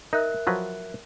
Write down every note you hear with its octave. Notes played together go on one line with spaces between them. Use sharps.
D#4 A#4 E5 F#6
F3 F#3 B4